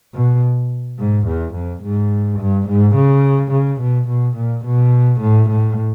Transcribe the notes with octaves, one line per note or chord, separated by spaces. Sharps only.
B2
G#2
E2
F2
G#2
G2
G#2
C#3
C#3
B2
B2
A#2
B2
A2
A2